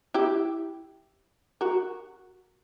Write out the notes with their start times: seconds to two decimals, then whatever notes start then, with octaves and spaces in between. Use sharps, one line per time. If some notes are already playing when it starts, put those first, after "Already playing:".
0.14 E4 G4
1.61 F#4 A#4